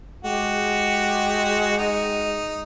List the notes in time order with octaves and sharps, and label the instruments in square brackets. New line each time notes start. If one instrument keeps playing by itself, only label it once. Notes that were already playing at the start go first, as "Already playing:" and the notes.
[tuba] G#3 [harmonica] F#4 G4
[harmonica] D#4